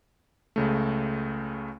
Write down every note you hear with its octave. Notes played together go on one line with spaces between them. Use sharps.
C#2 C#3 A3